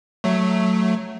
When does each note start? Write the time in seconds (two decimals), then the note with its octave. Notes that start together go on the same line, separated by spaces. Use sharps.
0.24 F#3 A3